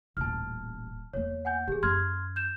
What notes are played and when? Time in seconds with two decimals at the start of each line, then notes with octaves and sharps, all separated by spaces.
0.17 D#1 A1 A5 F6
1.14 E2 A#3 C#5
1.45 F#5 G#5 G6
1.68 E3 G4 G#4
1.83 F#2 C6 F6 G#6
2.36 G6 E7